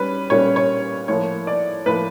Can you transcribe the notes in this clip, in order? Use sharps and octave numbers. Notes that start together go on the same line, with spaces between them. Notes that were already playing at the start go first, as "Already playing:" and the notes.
Already playing: G3 C#4 B4
A#2 G3 A#3 C#4 C#5
C#5
A2 F3 A#3 C#5
D5
A2 F3 A#3 B4